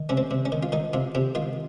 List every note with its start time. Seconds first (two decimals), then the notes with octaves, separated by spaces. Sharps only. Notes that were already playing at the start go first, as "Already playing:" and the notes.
Already playing: D#3
0.09 C3 C#4
0.17 C4
0.31 C3
0.45 C#4
0.52 D#3
0.63 F4
0.72 D#3 D#4
0.93 C3 F4
1.15 C3 G4
1.35 D#3 F4